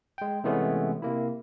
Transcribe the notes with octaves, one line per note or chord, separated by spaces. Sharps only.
G#3 G5
C3 E3 G#3 A3 B3 C#4
C3 A#3 E4